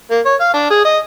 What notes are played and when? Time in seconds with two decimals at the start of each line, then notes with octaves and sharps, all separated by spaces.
0.11 A#3
0.25 C#5
0.40 F5
0.54 D4
0.70 G#4
0.85 D#5